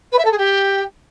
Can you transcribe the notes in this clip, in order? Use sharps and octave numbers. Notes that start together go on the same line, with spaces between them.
B4
E5
A4
G#4
G4